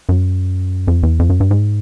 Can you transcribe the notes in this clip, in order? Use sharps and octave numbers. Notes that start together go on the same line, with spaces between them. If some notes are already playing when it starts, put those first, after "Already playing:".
F#2
F2
E2
F2
F#2
G2
G#2